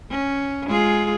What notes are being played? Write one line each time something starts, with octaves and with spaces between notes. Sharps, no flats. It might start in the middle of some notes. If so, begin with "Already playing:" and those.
C#4
G#3 F4 G#4